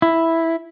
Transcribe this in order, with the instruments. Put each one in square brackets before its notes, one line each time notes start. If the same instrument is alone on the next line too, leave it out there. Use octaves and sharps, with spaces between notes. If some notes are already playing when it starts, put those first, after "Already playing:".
[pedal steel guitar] E4